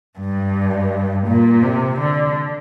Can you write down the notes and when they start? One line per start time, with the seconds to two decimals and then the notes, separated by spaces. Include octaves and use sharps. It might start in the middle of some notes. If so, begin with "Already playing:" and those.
0.19 G2
1.27 A#2
1.63 C3
1.99 D3